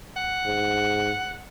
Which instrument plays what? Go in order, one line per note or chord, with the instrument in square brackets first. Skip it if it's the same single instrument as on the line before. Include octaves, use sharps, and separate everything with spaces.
[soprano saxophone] F#5
[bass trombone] G#2